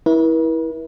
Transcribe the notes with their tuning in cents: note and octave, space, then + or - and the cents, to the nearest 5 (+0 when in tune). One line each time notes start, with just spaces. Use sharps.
E4 -20 B4 -45